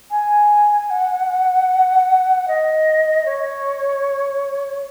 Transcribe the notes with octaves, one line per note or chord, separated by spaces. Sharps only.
G#5
F#5
D#5
C#5